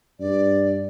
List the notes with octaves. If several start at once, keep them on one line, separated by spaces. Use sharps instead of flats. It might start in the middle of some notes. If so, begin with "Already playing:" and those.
G2 D5